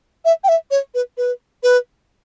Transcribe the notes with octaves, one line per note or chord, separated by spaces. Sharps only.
E5
G5
E5
C#5
B4
B4
B4